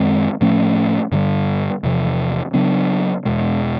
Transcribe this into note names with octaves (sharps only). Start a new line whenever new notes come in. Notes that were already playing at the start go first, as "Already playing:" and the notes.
Already playing: F#2 D#3 G#3 C4
A2 F3 A3 C#4
G2 D3 G3
E2 C3 F3
C#3 F#3 B3 D4
E2 B2 G#3